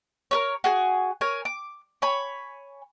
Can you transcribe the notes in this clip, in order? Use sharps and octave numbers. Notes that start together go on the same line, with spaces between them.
A#4 B4 C#5
F#4 G#4 G#5
A#4 C#5 G#5
D6
C#5 G#5 B5